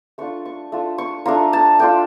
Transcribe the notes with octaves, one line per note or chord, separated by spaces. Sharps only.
A3 D4 F4 C#6
C#6
A3 D4 F4
C#6
A3 D4 F4 A#5
A5
A3 D4 F4 G5